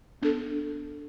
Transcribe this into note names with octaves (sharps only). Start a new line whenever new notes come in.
B3 D4 A4